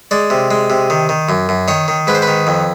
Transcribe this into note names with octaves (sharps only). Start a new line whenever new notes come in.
G#3 D5
C3
G#3
C3
D#3
D#3
F#2
F#2
D#3 C#5
D#3
G#2 B4
C5
B4
D#3
F2